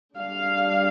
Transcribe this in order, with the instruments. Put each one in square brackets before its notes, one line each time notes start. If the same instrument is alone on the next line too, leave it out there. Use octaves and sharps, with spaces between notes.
[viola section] G3 D4 F5